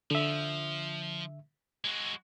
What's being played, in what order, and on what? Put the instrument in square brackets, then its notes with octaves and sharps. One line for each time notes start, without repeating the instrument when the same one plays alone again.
[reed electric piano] D3 E5 [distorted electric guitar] F3
[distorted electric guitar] G#3 F#4